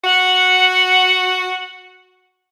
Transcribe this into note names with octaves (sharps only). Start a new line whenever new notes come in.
F#4 F#5